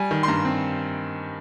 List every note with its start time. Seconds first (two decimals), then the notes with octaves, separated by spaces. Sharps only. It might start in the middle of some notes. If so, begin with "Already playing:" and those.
Already playing: G3 G#5
0.11 D#3
0.23 C6
0.28 G2 A#5
0.45 C4